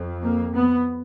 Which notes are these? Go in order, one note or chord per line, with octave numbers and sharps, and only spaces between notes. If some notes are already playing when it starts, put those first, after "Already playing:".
Already playing: F2
A#3
B3